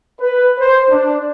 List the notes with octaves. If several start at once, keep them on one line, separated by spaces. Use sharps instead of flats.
B4
C5
D4